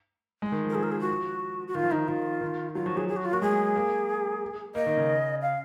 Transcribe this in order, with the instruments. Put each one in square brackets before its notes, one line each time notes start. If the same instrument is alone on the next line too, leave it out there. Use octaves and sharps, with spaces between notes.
[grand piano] G#3
D#3
F3
[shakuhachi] A#4
[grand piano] F3 [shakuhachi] G#4
[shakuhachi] A#4
G#4
F#4
F#4
[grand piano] D#3 [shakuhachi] F4
[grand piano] F3
[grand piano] D#3 [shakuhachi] D#4
[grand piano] D#3 [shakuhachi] F4
[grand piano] D#3
[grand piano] F#3 [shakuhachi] F4
[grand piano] F3 [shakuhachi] F#4
[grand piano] F#3 [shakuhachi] G#4
[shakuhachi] G#4
F#4
F4
[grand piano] A#3 [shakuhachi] F#4
[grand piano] G#3 [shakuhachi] G#4
[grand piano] A#3
[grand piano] A#3 [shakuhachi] D#5
[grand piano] D#3
C#3
[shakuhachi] F5